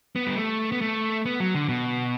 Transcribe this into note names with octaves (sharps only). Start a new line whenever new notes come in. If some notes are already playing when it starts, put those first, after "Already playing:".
B3
G3
A3
B3
A3
B3
F#3
D3
B2